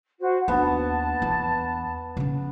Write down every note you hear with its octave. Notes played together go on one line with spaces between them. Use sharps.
F#4 C5
D#2 B3 D4 A5
E2
C#3 C#4